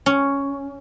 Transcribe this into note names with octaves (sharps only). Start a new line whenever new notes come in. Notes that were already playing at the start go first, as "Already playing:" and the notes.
C#4